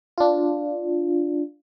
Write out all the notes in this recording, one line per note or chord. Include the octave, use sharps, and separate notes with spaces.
D4 F4